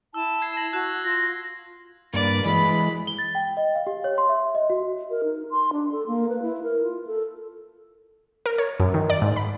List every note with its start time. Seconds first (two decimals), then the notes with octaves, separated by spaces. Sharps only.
0.14 E4 A5 E6
0.42 G#6 C7
0.56 G#6 A#6 F#7
0.73 F#4 E6 F#6 G#6
1.04 F4 A#6
2.13 G2 A#3 B4 D5
2.45 E3 G#3 B5
3.07 G7
3.19 A6
3.35 G5
3.57 D#5
3.75 F5
3.87 G4
4.04 C#5
4.18 C6
4.29 E5
4.55 D#5
4.70 F#4
5.10 A#4
5.24 D#4
5.50 C6
5.72 D4
5.92 A4
6.07 A#3
6.29 B4
6.42 E4
6.63 A#4
6.83 F4
7.07 A4
8.46 A#4
8.58 C#5
8.80 F#2
8.94 D#3
9.10 D5
9.22 G#2
9.36 B5